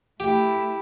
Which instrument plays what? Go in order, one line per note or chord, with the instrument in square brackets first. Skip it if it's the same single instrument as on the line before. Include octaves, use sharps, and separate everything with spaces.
[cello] A3 E4 [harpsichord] G4